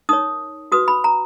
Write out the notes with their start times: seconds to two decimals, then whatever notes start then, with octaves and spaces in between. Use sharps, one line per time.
0.09 D#4 A#4 C#5 D#6
0.72 F#4 B4 D#6
0.88 B5
1.04 A#5